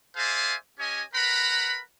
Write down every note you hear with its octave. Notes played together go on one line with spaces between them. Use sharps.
G#4 C5 D5 E5 F5 G#5
C#4 G4 C#5 D#5 G#5
A#4 B4 F#5 A#5 B5